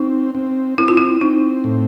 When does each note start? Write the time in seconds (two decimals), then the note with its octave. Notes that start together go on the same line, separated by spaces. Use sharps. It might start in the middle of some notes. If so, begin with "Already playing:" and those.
Already playing: C4 D#4
0.35 C4
0.78 C4 E4
0.88 F4
0.97 E4
1.21 C4 D#4
1.64 A2